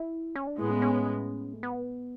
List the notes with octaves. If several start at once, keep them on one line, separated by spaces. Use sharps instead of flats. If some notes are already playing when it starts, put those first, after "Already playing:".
Already playing: E4
C#4
D4
A2 G#3 B3 E4
C#4
C#4
A3
B3